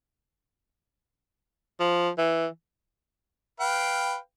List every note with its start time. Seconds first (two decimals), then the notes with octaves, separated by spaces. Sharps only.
1.80 F3
2.18 E3
3.60 B4 F5 G5